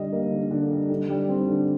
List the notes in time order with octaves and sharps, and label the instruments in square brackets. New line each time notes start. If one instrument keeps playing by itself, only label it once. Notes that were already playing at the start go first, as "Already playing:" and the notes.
Already playing: [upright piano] D3 G3 D#5
A#3
D3
D3
G3
D3
G3
C4
D3